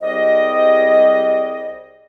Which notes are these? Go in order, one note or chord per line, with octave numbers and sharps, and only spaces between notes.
C2 G3 C4 G#4 D#5